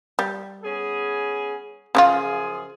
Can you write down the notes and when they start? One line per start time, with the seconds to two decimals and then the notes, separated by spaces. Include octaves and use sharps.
0.19 G3
0.64 B3 C#4 G#4
1.95 F#2 C#3 F3 C#4 F4 G#4